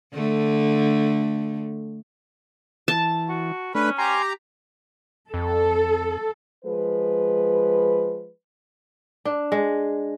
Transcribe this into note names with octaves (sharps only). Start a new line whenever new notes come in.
D3 A3
E3 A5
F#4
A3 C#4 D4 B4
G4 G#5 A#5 C6
F2 A4
F3 G#3 B4
D4
G#3